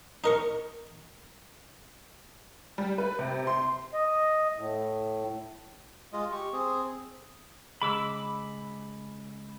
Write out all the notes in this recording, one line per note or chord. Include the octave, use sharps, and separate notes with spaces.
D#4 A#4 C#6
G3
B4
C3
C6
D#5
A2
G#3 F4 D#5
G4 C#6
C4 G#4
C#3 G#3 B5 D6 E6